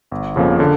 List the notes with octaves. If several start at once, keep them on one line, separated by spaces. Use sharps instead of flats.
G1
F2 C#3 F3 A#3
D3